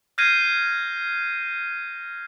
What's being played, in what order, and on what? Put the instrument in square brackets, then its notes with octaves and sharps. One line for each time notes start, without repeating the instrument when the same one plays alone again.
[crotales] F6 G6 G#6 A#6 C7 D#7